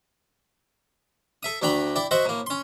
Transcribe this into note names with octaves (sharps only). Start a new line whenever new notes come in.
A4 E5 D#6
D2 A3 D4 G5 A#5 B5
E4 D5 G5
F#4 C5 D#5 E5 F#5
A2 A#3
C#4 C6